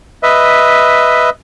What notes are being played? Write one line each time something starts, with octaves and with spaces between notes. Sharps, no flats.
B4 D#5 E5